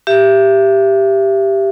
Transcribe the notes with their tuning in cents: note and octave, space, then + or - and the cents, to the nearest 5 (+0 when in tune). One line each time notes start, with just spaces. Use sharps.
G4 +0 E5 +30